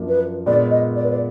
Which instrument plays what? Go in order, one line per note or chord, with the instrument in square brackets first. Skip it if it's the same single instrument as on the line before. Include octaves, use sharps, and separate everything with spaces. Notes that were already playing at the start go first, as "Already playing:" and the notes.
Already playing: [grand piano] F#2 F3 A#3 D4
[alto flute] B4
[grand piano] A#2 G#3 B3 D4 [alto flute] D5
[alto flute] D#5
D5
B4
D5